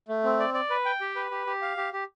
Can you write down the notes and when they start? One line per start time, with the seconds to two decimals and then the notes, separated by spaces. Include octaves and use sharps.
0.08 A3
0.24 C4
0.39 D5
0.54 D5
0.70 B4
0.85 G5
1.01 G4
1.16 B4
1.31 G4
1.47 G4
1.62 F5
1.77 G4
1.93 G4